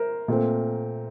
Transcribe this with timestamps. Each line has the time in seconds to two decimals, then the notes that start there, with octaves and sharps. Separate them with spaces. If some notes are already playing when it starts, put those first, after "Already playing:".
Already playing: A#4 C5
0.28 A#2 A3 C4